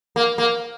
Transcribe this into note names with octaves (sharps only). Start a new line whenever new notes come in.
A#3
A#3